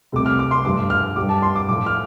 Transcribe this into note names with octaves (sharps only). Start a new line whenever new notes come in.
C2 C3 A3 D6
F6
D6
C6
G2 F3 A3 D6
F6
G2 G3 D6
A5
C6
D6
A2 F3 A3 D6
F6